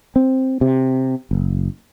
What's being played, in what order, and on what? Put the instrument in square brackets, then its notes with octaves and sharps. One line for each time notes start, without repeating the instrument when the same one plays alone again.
[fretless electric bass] C4
C3
F#1